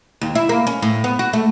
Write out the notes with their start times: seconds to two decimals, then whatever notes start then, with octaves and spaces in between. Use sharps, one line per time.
0.22 D#2
0.35 E4
0.49 A#3
0.67 C#4
0.82 A2
1.04 B3
1.19 F#4
1.33 A3